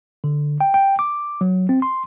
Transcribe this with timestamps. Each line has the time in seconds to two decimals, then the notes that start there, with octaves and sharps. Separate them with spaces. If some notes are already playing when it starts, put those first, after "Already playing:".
0.24 D3
0.61 G5
0.74 G5
0.99 D6
1.41 F#3
1.69 C4
1.82 C6